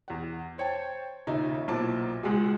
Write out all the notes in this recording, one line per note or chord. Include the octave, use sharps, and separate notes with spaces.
E2 F#5
C5 C#5 G5 A5
D#2 A#2 C#3 D#4 E5
B1 A#2 E4 C5 A5 D6
C#2 G#3 F#4 G#4